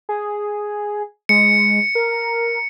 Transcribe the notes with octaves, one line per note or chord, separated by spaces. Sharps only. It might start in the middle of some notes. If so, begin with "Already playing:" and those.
G#4
G#3 C#7
A#4